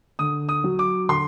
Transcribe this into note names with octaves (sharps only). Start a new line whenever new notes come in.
D3 D#6
D#6
F#3
D6
D3 C6